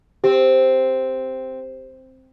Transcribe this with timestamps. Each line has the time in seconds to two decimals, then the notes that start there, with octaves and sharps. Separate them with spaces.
0.24 C4 G4